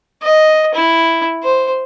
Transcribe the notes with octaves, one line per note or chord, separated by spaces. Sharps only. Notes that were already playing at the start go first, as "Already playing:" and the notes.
D#5
E4
C5